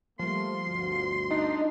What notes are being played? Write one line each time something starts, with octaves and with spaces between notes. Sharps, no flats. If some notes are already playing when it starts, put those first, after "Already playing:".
F3 G3 A3 A#3 C6
G1 D2 F#4
D4 D#4